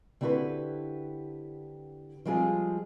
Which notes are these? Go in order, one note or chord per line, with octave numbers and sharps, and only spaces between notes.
D3 C4 E4 F#4 G4 B4
F3 G3 G#3 C4 F4 G#4